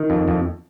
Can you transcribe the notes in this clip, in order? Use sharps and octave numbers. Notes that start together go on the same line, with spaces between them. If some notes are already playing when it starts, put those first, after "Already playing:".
Already playing: D#3
F2
F2